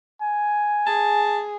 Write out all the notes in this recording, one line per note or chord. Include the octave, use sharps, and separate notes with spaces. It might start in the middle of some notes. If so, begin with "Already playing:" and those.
G#5
G#4 A5